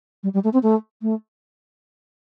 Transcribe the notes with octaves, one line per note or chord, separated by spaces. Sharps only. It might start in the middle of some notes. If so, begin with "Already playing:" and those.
G3
G3
A3
C4
A3
A3